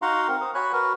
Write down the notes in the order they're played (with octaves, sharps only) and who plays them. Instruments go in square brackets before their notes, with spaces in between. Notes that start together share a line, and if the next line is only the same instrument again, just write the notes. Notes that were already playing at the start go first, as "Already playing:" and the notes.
[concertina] D#4 F#4 F5 F#5 A#5 C6
C4 A#4
C5 D#6
F#4 C#5 G#5 B5 F#6
F#4 A#4 B4